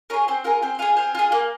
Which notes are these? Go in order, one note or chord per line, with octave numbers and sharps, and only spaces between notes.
F4 G#4 A#4 C#5
C4 C5
F4 G#4 A#4
C4 C5
F4 G#4 F5 G#5
C4 F5 G#5
F4 G#4
A#3